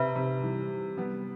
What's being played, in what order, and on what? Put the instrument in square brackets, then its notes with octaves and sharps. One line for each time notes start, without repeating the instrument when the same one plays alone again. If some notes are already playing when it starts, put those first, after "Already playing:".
Already playing: [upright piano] C3 [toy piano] B4 E5 B5
[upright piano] C3
E3 G3
G3 B3